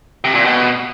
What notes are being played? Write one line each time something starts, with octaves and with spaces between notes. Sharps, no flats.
C3
A#2
B2